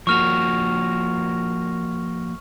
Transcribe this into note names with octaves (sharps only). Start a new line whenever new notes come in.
F3 A#3 F#4 C#6 F6 F7